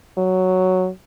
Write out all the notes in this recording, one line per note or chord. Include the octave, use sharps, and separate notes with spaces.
F#3